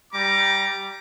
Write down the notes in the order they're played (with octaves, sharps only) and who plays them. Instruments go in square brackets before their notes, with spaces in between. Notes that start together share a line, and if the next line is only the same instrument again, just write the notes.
[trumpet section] G3 A#5 D6